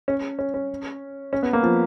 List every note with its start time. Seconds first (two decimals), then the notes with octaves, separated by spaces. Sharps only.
0.08 C#4
0.39 C#4
0.54 C#4
1.33 C#4
1.43 B3
1.53 A#3
1.63 F3